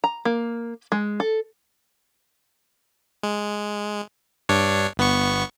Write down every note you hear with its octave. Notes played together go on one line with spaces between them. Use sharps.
A#5
A#3
G#3
A4
G#3
G2 D4 C#5
G1 B3 C#6